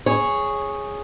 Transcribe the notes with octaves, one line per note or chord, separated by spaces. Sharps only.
G#4 C#5